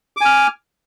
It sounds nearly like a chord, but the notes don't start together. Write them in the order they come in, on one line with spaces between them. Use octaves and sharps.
D6 G#5 F6